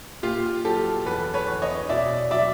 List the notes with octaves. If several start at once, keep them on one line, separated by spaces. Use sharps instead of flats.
A#2 F4 G4
F#3 G4 A4
E2 A4 B4
B4 C#5
E2
C#5 D#5
B2 D5 E5
F#3 D5 E5